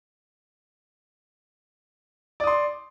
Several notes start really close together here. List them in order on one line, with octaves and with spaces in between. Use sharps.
D5 D#6 C6